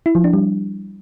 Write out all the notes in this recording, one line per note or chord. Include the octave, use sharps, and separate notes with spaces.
E4
F3
D4
G3